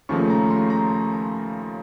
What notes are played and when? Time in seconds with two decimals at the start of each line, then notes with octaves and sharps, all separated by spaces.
0.09 D#2 C#3 F3 A3 C#6
0.30 A#5
0.50 C6
0.70 A#5